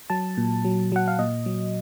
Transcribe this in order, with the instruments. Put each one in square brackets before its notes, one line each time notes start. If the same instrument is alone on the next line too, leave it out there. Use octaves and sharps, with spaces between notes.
[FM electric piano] F#3 A5
A#2
F#3
F#3 F#5
F5
A#2 D#5
F#3